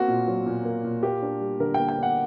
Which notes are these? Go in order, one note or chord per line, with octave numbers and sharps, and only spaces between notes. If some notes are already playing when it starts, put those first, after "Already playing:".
Already playing: A#3 C4 F#4
A#2
F#3
A#2
A#3
A#2
A#3 G4
D4
G3
D3 A#4
A#3 G5
G5
D4 F#5